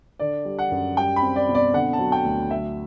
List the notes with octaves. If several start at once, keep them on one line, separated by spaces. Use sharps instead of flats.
D3 D5
G3
F#5
F#2
G3 G5
B5
C4
D5
B2
D5
D3 F#5
A5
F#3
G5
D2
F#3 E5